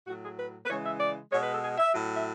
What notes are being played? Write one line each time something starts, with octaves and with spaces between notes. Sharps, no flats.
A2 F#3 F#4
G#4
B4
B4
C#3 E3 G#3 C#5
E5
D5
B2 G#3 C#5
B4
A4
G#4
E5
A2 F#3
E5